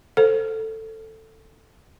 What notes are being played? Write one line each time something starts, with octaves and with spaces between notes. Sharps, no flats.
A4 C5